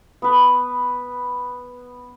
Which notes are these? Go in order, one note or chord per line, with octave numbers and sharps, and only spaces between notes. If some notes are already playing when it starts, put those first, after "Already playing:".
B3 B4